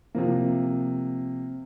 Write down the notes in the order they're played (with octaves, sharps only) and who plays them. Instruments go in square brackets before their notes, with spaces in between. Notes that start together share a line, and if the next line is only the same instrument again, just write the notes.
[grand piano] C3 F3 A#3